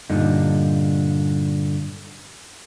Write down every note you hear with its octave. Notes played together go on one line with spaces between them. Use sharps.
G2 A#2 D3 D#4